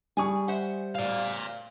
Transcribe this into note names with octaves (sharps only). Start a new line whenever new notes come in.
G3 G#4 G#5 C#6
C5 E5 F#5
D5 F5